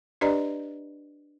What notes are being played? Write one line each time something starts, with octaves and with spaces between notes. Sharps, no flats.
D4 G4 B4 D5 D#5 A#5